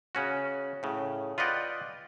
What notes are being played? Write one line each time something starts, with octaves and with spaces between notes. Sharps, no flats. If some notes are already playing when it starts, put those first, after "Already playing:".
C#3 C#4 F#4
A2 C#3
F4 B4 D5 D#5 F#5 G5